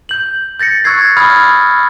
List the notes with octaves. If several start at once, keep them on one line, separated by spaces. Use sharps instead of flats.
G6 F#7
G6 A6 A#6 C#7
C#6 E6 F#6 G#6 C7
B5 D#6 F6 G#6